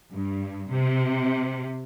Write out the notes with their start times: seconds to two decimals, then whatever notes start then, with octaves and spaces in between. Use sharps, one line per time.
0.14 G2
0.71 C3